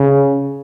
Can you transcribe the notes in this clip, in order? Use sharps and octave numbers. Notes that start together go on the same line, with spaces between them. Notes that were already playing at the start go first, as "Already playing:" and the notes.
Already playing: C#3